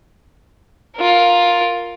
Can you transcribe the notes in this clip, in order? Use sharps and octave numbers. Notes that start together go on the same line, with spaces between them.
F4 A#4